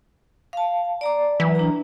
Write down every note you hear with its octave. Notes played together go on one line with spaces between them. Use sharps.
F5 A5
D5 A#5 D6
E3 F#3
D4 A#5